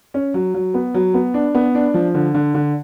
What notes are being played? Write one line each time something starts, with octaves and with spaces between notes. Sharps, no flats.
C#4
F#3
F#3
B3
F#3
B3
D4
B3
D4
F3
D3
D3
D3